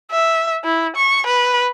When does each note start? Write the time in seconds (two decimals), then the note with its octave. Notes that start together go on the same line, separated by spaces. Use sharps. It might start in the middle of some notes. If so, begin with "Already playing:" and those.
0.11 E5
0.64 E4
0.96 C#6
1.27 B4